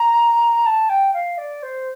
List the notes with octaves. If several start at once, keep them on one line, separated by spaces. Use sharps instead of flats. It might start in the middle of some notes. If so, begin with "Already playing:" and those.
Already playing: A#5
A5
G5
F5
D5
C5